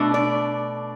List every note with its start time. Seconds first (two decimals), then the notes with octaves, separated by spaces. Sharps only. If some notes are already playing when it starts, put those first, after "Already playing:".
Already playing: B2 A3 D4
0.14 D5